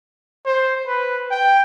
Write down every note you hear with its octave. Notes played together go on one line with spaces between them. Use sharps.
C5
B4
G5